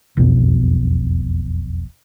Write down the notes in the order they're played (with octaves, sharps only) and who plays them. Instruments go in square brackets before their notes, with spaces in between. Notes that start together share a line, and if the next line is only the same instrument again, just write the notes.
[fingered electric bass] E1 B1 F2 B2